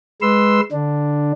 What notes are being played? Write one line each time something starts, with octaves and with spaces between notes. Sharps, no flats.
G#3 B4 C6 E6
D3 D4